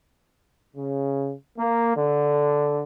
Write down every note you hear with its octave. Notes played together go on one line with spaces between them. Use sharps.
C#3
A#3
D3